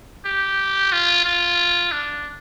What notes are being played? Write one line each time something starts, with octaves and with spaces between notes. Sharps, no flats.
G4
F4
F4
D4